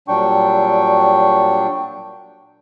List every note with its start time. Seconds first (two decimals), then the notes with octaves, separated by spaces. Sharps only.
0.08 A#2 F#3 G3 D4 G5 C#6